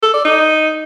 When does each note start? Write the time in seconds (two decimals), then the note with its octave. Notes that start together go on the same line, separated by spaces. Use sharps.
0.03 A4
0.14 D5
0.25 D#4